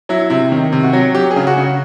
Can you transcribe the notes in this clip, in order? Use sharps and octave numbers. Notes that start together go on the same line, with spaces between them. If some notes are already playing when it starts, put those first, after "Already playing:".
F#3 E4
C3 E4
D#3
C3
F#4
F#3
F#3 G4
G#4
C#3
F#4
C#3